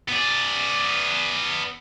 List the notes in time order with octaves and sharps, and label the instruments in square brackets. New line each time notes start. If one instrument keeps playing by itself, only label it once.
[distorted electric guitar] B3 D5